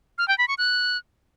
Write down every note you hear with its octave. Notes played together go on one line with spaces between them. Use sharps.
F6
G5
B5
C#6
F#6